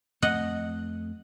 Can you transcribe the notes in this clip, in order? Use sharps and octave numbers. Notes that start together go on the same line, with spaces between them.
F2 A3 C4 D#5 F#5